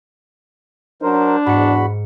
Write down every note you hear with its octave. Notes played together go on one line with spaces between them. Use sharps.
F#3 D4 A#4 C5
E2 G#2 F#4 B5 C#7